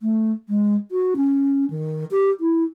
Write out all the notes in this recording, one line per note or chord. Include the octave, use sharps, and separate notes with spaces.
A3
G#3
F#4
C#4
D#3
G4
E4